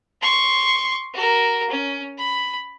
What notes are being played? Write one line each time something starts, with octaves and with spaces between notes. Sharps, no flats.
C6 C#6
F#4 A#4
C#4
B5